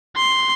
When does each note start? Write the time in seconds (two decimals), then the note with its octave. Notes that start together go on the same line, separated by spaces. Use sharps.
0.17 C6